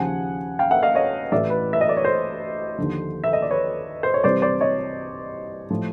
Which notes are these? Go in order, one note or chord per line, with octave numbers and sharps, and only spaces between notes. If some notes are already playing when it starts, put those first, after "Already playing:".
Already playing: D#2 C#3 F3 F#5 G#5
F5 G5
E5 F#5
D#5 F5
C#5 D#5
A1 A2 E3 D5 E5
B4
E5
D#5
D5
C#5
C5
D#2 D3 F3
E5
D#5
D5
B4 C#5
C5
C#5
C2 C3 E3 C5 D5
C5 D5
C#5 D#5
A2 F3